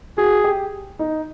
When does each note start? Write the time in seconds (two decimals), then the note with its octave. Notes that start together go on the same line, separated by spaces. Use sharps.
0.18 F#4 G#4
0.44 G4
0.99 D#4